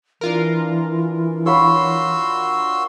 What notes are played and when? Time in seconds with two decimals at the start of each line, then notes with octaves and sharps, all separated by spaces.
0.21 E3 D4 F4 A#4
1.46 F#4 C#5 F5 B5 C6 E6